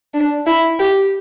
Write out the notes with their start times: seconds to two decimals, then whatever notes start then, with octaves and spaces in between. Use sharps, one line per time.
0.14 D4
0.47 E4
0.79 G4